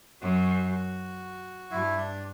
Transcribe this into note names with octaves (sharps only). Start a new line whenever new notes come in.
F#2 F#4
F#4
G2 E4
D4